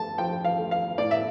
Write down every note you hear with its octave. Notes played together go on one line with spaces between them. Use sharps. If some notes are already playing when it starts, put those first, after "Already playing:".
Already playing: A3 A5
F3 G5
F5
A3
F5
A2 D5
E5